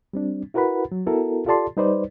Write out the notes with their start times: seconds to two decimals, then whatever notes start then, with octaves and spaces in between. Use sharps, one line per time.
0.13 G3 C4 D4
0.54 E4 F#4 A#4 B4 F#5 B5
0.92 F#3
1.06 B3 E4 F#4 A4 A#4
1.46 F4 G4 A4 D5 A5 C6
1.77 G3 D#4 B4 C5 D5